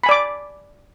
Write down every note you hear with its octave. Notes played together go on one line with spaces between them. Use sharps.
D5 G#5 B5 D6